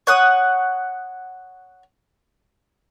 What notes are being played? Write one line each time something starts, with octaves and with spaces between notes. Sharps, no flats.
C#5 F#5 D#6